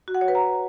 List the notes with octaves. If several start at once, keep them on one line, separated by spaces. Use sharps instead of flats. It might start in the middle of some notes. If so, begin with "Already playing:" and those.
F#4
F#5
C#5
B4
A#5